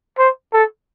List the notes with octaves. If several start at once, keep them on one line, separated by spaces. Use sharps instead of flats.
C5
A4